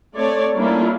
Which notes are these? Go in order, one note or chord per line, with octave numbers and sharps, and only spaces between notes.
A3 C4 C#5 D5
G3 A#3 C#4 D4 E4 F4